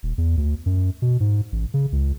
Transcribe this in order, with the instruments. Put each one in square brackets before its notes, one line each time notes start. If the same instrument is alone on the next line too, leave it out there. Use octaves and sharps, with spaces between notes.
[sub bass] D#1
E2
D2
F#2
B2
G#2
A1
C#3
C#2